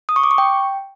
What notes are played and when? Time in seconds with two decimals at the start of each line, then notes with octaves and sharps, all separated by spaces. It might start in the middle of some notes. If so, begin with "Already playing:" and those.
0.09 D#6
0.16 C#6
0.23 D6
0.31 C#6
0.38 G5